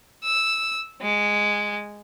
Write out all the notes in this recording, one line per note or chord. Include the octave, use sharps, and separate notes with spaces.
E6
G#3